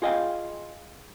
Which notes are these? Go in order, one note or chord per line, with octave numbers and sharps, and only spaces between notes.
F4 G#4 D#5 F5 G5